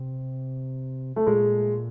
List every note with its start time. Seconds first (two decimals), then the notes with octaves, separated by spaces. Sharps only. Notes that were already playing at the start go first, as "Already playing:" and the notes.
Already playing: C3
1.16 A3
1.27 A#2 G#3